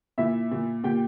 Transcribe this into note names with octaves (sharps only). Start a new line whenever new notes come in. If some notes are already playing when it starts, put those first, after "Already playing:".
A#2 E4 E5
A#2
A#2 G4 G5